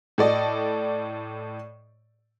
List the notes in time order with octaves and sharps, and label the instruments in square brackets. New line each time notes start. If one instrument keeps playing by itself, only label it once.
[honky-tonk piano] A2 A4 D5 D#5